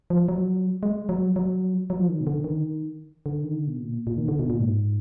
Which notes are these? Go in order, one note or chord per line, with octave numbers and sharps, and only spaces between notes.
F3
F#3
G#3
F#3
F#3
F#3
F3
D#3
B2
D3
D#3
D3
D#3
D3
B2
A#2
A#2
D#3
D3
B2
A#2
G#2